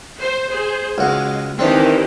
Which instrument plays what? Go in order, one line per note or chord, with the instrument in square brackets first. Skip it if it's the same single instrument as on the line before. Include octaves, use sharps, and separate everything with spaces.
[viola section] C5
G#4 C5
[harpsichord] C#2 F#4 [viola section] G#3
[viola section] D#3 E3 G4 [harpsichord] C4 D4